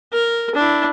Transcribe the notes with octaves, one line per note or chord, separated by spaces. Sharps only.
A#4
D4 E4